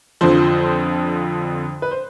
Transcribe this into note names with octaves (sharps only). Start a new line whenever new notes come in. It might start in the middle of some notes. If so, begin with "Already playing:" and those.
F2 D3 F3 C5
B4
C5